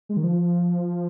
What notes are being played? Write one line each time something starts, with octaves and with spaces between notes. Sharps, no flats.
G#3
D#3
F3